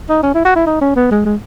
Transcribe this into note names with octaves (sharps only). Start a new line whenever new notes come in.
D#4
C#4
E4
F#4
E4
D#4
C#4
B3
G#3
G#3